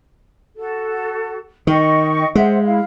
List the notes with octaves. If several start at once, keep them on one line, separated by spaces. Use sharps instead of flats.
F#4 A4
D#3 D#5 G5 C#6
G#3 C5 E5 F#5
E4 F5